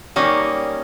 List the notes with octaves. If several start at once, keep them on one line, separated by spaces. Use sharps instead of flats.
G3 A#3 C#4 D#4